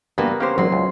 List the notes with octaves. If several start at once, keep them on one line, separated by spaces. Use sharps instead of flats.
G2 A#3 B3 F#4
A#3 C#4 G4 C5
G#1 F#3 C6
C#2